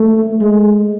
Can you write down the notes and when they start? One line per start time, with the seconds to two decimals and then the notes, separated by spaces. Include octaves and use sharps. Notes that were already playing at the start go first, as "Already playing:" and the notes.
Already playing: A3
0.41 G#3